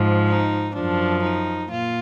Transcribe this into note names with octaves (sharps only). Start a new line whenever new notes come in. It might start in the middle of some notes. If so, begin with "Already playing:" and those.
Already playing: G#2 F3
D#4
F#2 F3 D4
D#4
A#2 F4